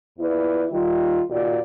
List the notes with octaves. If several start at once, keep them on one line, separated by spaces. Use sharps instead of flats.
E2 E4 F4 B4 D5
D#3 G3 F4
D#2 A#2 F4 F#4 D5